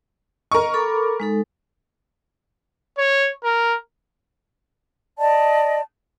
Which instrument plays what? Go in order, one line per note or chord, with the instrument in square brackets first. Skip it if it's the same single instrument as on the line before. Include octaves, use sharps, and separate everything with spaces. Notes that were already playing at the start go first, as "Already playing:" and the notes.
[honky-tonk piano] A#4 C#6 [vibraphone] D#5
[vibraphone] A4 B5 D6
G#3 D#4 A4
[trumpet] C#5
A#4
[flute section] D5 D#5 A5